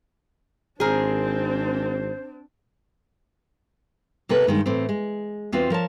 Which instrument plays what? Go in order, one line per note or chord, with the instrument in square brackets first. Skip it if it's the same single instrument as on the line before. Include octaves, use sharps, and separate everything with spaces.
[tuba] G#1 [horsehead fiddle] C4 D4 [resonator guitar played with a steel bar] G#4 A#4 [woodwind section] C5
[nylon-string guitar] C3 A#3 A4 B4
G2 D#3 G#3
A2 E3 C4
G#3
E2 C4 F4 F#4 B4
F3 A#4 C#5 A5